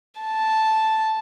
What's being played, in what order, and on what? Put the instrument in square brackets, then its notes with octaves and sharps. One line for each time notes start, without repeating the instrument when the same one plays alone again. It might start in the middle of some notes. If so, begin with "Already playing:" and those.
[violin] A5